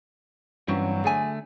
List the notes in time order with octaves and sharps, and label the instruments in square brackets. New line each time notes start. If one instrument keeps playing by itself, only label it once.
[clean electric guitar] G2 E3 C4 [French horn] F#3 [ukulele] C#4
[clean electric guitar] D3 A3 [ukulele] G#4 G#5